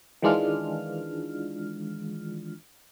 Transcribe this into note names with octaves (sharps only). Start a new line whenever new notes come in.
D#3 E3 G#3 D4 F4 F6